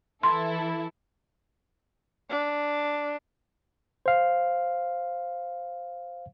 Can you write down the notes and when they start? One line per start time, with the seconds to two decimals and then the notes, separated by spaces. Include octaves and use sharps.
0.23 E3 E4 A4 C6
2.29 D4
4.06 C5 F5